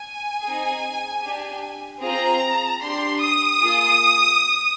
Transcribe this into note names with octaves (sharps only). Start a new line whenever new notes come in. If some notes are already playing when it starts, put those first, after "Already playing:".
Already playing: G#5
C4 D#4 G#4
D4 G4
C4 F4 G#4 A#5
D4 G4 C6
D#6
A#3 F4 G#4